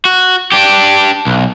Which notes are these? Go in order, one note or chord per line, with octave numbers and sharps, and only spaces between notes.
F#4
D4 G4
B1